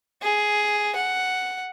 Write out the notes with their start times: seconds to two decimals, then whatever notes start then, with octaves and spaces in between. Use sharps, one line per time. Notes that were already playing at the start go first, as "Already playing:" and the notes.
0.22 G#4
0.96 F#5